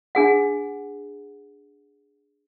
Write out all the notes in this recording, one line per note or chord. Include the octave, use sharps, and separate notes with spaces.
D4 G#4 F#5